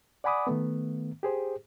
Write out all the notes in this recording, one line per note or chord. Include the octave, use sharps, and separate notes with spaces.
D5 F#5 G#5 B5 D6 D#6
D#3 A3 B3
G4 G#4 C5